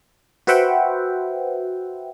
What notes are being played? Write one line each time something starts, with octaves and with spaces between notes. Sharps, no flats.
F#4 B4 C5 E5 F#5 G5